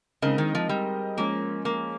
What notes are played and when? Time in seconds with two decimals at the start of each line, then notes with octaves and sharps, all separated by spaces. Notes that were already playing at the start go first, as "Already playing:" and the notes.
0.22 C#3 G#3 C4 D#4 A#4 D#5
0.38 D#3
0.55 F3
0.69 G3
1.17 F3 G#3 A#3 C#4
1.65 A#3